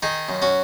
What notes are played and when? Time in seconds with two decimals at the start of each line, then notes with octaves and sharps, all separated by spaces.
0.02 D#3 D#4 G#4
0.29 F#2
0.42 C#4 F#4